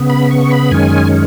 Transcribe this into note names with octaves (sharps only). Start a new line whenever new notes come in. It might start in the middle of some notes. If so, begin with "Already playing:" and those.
Already playing: C#3 B3
B5
C#6
B5
F#2 D#3 G#3 C#4 G#5